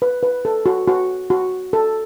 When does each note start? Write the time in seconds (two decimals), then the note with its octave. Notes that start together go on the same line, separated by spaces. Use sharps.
0.02 B4
0.23 B4
0.45 A4
0.66 F#4
0.88 F#4
1.30 F#4
1.73 A4